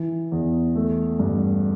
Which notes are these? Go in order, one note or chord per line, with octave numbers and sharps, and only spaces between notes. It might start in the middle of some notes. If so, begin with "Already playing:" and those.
Already playing: E3
E2
A3
G2